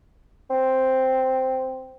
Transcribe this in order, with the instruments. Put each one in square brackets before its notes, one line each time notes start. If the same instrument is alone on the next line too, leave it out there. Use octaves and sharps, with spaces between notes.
[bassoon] C4